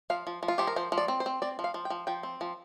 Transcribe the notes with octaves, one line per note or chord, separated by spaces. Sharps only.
F3 F5
F3
F3
F4
F3 G4
A#4
F3 C5
F3
D5
C4
C5
C4
C4 D5
F3
F5
F3
G5
F3
F3 G5
C4
F3